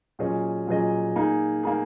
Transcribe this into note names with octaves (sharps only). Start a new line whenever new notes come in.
A#2 F#3 C#4 G#4 D#5
A#2 F#3 C#4 G#4 D#5
A#3 D#4 G#4
A#3 D#4 G#4